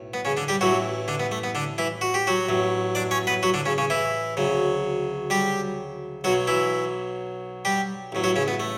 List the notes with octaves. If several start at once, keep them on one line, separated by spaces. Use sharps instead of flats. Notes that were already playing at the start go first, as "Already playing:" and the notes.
Already playing: B1 A2
B3
C#3 C#4
D3 D4
G3 G4
A1 A2 E3 F#3 F#4
D3 D4
B3
A3
B3
D3 D4
E3 E4
F#4
G4
F#3 F#4
A1 A2 F#3
D4 D5
C#4 C#5
B3 B4
F#3 F#4
D3 D4
C#3 C#4
C#3 C#4
E3 E4
D2 C#3 F#3
G3 G4
B1 B2 F#3 F#4
E3 E4
G3 G4
A1 A2 F#3
F#3 F#4
C#3 C#4
B3
A3